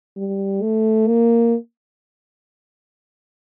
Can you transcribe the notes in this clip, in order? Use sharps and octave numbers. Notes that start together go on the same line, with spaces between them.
G3
A3
A#3